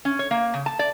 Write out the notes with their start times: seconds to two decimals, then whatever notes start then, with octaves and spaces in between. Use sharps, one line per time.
0.05 C#4
0.19 C#5
0.31 A#3
0.54 C#3
0.66 A5
0.79 D5